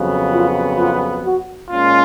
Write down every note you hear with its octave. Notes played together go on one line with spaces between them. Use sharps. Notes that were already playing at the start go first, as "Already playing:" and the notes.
Already playing: F2 C#3 F#3 B3
F4
F4
F#4
A#2 G#3 C#4 F4